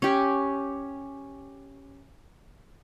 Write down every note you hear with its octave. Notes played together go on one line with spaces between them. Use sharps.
C#4 G4